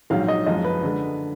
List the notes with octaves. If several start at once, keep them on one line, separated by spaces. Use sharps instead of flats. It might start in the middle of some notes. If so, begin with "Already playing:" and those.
A#1 G#2 F#3 F5
D#5
F#1 F#2 F3 G#3 D#5
B4
D3 G#3